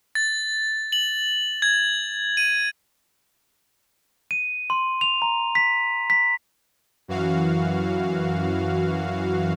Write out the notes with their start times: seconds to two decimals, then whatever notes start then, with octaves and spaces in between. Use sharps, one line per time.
0.15 A6
0.92 F#7
1.62 G#6
2.37 D#7
4.31 D#7
4.70 C6
5.01 F7
5.22 A#5
5.55 B6
6.10 B6
7.08 F#2 E3 F#4 F5